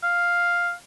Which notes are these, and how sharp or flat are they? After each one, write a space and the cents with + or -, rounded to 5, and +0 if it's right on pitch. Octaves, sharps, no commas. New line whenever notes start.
F5 +5